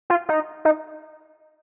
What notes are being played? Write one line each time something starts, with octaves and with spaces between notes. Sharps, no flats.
F4
D#4
D#4